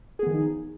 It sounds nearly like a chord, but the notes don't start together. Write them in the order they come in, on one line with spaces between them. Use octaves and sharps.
G#4 B3 D#3 F3 D#4